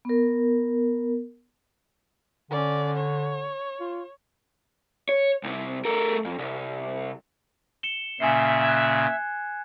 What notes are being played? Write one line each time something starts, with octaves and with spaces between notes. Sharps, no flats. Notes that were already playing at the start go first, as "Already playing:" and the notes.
B3 A#4
D3 C#4 D5
C#5
F4
C#5
C2 C3
A3 A#4
F2
C2
C#7 E7 G7
A#2 C#3 E5 G#5 C7
F#6 G#6